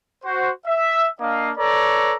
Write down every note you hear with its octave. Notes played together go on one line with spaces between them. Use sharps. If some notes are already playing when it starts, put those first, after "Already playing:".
F#4 C5
E5
A#3 D4 D#5 F5
A4 B4 C#5 D5 A#5